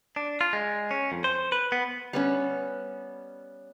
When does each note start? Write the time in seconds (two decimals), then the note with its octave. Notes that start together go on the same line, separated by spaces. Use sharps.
0.16 D4
0.41 F4
0.53 G#3
0.91 C#4
1.12 F2
1.24 C5
1.52 B4
1.72 B3
2.13 G3 B3 C#4